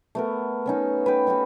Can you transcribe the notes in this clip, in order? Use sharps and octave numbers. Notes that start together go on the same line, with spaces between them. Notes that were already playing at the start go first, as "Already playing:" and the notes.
A3 B3 A#4
B3 C#4 D#4
B4 G5
B3 D#4 F#4 G4